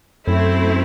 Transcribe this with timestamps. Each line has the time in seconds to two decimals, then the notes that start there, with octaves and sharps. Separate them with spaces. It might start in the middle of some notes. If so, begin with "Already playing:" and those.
0.27 F#2 A3 C4 E4